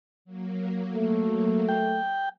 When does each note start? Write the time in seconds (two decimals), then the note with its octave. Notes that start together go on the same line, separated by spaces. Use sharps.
0.25 F#3 A#3
0.95 A3
1.69 G5